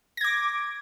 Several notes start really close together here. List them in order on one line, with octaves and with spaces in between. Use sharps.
A#6 G#6 D6